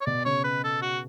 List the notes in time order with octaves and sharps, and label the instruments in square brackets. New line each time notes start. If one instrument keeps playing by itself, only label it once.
[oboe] C#5
[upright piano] B2 [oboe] D5
[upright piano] C#3 [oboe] C#5
[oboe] B4
A4
F#4